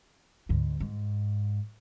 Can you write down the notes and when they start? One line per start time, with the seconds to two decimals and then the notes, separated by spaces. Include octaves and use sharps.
0.49 D2 G#2
0.80 G#2